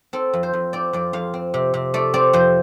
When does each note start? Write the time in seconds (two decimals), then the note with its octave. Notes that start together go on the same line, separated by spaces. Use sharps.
0.13 C4 A4
0.33 F2
0.43 C5
0.54 F2
0.73 C4 D5
0.93 F2 D5
1.13 F2 F5
1.34 C4
1.54 C3
1.74 C3
1.94 A3 D5
2.14 C4 D5
2.33 F2 C5